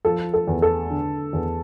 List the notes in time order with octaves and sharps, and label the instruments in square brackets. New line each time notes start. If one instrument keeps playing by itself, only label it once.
[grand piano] F3 [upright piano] A4
[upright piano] A4
[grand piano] E2
[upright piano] A4
[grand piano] D3
E2